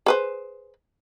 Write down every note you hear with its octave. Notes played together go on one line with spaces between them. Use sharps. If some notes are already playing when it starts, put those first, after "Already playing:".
G#4 B4 C5